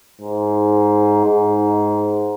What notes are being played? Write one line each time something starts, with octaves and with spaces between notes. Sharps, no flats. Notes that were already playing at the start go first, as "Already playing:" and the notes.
G#2
G#2